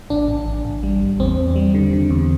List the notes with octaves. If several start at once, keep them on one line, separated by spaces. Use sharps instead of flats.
A1 D4
A1
A1
A1
G3
A1
E2 C4
E2
G3
D3
D3
E2